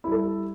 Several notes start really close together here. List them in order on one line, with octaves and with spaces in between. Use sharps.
E4 G3 A4